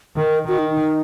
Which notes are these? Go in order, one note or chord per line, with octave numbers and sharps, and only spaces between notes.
D#3 A#4
D#3 F#4
D#4
D#4